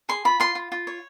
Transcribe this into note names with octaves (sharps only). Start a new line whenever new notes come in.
G#4 C6
F4 B5
F4 C6
F4
F4
C#5